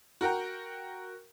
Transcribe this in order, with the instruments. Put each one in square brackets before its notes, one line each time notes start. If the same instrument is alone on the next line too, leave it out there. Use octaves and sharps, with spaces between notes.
[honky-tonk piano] F#4 A#4 F#5 G5 A#5